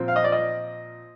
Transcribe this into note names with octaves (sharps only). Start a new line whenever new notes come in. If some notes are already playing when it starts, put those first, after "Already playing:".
Already playing: A#2 F3 C4
F5
D#5
D5
D#5